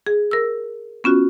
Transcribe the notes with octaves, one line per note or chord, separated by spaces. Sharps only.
G#4
A#4 E6
B3 C#4 F4 F#4